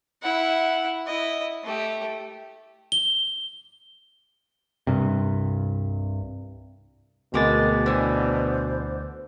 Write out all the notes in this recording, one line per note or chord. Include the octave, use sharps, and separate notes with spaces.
E4 F#5
E4 D#5
A3 G4
G7
C2 G2 C3
D2 B2 G#3 B3 C4 A#4 D6 A6
D3 E3 C5